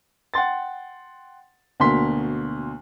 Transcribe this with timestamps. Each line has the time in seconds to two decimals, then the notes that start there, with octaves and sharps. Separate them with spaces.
0.34 F#5 G5 C6 A6
1.80 D2 B2 A#3 C6 B6